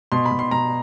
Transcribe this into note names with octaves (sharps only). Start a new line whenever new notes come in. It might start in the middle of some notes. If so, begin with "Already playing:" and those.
B2 C6
B5
B2
C6
B2 A#5